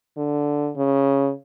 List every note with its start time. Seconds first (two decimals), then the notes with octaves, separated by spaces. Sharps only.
0.17 D3
0.77 C#3